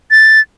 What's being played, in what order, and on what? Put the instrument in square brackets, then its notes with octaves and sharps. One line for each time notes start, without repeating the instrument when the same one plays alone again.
[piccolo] A6